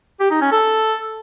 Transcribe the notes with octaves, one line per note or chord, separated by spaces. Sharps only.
G4
D#4
C#4
A4